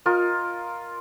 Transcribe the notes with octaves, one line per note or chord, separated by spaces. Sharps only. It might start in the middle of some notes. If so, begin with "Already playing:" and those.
F4 A#4 D#5